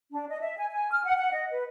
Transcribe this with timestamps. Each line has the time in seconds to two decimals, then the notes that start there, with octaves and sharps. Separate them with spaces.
0.11 D4
0.28 D#5
0.41 E5
0.58 G#5
0.72 G#5
0.91 F6
1.04 F#5
1.17 F#5
1.32 D#5
1.50 B4